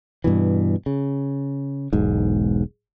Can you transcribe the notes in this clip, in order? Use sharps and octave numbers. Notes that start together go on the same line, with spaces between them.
G2 B2 E3
C#3
E1 B1 G#2